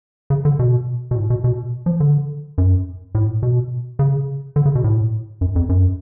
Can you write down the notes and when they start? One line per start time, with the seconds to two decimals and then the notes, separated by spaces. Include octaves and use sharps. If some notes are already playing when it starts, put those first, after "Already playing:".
0.30 C#3
0.45 D3
0.59 B2
1.11 B2
1.15 A2
1.30 B2
1.44 B2
1.86 F3
2.00 D3
2.58 F#2
3.15 A2
3.43 B2
3.99 C#3
4.56 D3
4.66 C#3
4.75 B2
4.84 A2
5.41 F#2
5.56 F2
5.69 F#2